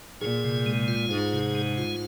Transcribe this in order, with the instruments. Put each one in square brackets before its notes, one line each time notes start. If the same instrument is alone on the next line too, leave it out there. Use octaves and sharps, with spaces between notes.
[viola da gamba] A#2 [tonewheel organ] G#4
[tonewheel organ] C3
G#3
F4
[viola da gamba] G#2 [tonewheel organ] G#4
[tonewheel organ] C3
G#3
F4